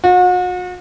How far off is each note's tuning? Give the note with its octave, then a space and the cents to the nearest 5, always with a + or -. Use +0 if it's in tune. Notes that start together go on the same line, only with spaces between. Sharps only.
F#4 -40